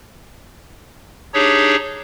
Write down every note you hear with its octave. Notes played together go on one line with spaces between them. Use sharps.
D4 D#4 G4 G#4 C#5